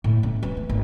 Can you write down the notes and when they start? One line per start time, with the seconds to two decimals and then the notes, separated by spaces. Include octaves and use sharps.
0.04 A2
0.23 C#4
0.43 E3
0.57 A3
0.69 G#1